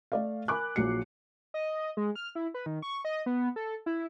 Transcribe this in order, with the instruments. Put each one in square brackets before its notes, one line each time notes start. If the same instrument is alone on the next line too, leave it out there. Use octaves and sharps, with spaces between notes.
[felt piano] A3 D5 F5
A#4 G#5 B5 D6 F#6
A#1 A#2 F#3 C7 C#7
[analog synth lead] D#5
G#3
F6
E4
B4
D#3
C#6
D#5
B3
A4
E4